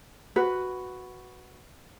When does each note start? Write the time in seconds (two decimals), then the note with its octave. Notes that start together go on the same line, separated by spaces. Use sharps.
0.36 F#4 B4